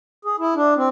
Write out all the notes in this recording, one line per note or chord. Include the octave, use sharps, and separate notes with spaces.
G#4
E4
D4
C4